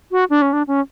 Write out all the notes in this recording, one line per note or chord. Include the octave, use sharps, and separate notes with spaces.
F#4
D4
C#4
D4
C#4